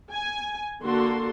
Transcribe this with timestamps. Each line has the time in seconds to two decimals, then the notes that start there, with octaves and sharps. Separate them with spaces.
0.12 G#5
0.82 D3 A#3 F#4 A4 C6